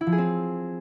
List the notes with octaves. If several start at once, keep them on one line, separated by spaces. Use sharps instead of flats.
E4
F3
G#4
C4